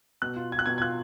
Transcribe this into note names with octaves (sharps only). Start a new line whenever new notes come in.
B2 F#6
F4
F4 G#6
F#6
B2 G#6
G#6
F4 F#6